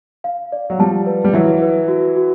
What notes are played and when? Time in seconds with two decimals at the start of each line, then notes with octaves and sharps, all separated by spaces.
0.24 F5
0.52 D5
0.70 F#3
0.79 F3 G3 A5
1.06 B4
1.24 G3
1.33 E3 F#3 E5
1.62 B4
1.88 F#4
2.16 F#4